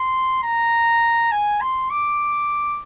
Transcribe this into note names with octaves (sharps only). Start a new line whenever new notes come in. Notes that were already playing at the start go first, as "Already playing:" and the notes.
Already playing: C6
A#5
G#5
C6
D6